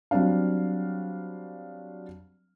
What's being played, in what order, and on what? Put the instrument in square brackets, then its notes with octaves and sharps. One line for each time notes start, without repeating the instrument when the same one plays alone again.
[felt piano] F#3 G3 C4 D4 F5